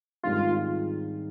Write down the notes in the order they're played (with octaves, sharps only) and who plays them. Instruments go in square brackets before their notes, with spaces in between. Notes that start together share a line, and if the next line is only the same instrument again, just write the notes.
[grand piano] G#2 D#3 G3 C4 [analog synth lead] F4